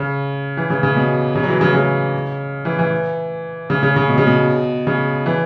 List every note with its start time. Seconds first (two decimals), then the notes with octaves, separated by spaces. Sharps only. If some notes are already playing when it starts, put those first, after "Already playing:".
Already playing: C#3
0.57 E3
0.70 C#3
0.83 C#3
0.96 B2
1.35 C#3
1.43 F#3
1.48 E3
1.61 C#3
1.75 C#3
2.65 E3
2.79 E3
3.70 C#3
3.83 C#3
3.96 C#3
4.09 B2
4.18 C#3
4.27 B2
4.87 C#3
5.26 E3